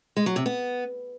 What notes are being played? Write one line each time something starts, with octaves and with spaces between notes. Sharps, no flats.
G#3
F#3
C3
B3